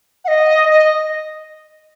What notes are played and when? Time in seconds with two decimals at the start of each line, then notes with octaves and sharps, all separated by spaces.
0.25 F#5
0.28 D#5
0.70 D#5